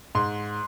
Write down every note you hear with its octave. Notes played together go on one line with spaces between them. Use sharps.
G#2 C6